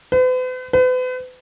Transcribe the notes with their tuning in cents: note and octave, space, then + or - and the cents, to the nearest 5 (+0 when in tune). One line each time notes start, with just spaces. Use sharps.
B4 +45
B4 +40